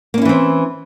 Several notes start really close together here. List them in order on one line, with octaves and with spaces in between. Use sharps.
A#3 C#4 E4 E3 C4